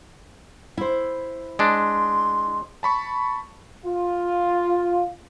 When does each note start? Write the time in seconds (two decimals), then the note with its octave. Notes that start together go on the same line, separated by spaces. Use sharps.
0.77 E4 C5
1.59 G#3 D4 C6
2.83 A5 B5 C#6
3.85 F4